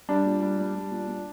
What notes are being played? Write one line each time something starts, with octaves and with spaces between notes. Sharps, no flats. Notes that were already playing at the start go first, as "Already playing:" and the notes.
G3 D4
A#2
G3
G3
G3
A#2
A#2